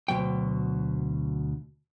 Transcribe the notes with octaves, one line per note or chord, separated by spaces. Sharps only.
D2 B2 F#3 G5